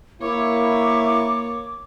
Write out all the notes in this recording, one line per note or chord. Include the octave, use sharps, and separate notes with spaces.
A#3 E4 C#5 D6